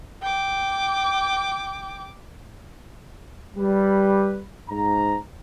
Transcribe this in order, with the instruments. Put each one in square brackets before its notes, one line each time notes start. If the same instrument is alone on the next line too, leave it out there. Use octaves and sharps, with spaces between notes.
[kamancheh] G5 D6
[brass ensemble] G3 B4
G#2 A#5